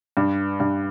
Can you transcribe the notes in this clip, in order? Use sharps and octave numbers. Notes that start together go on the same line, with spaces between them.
G2
G2